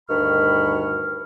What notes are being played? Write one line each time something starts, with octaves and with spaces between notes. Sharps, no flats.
D2 G2 D#3 B5 C#6 F6